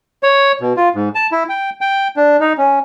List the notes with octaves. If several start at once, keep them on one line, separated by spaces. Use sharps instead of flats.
C#5
B2
F4
G#2
A5
E4
G5
G5
D4
D#4
C#4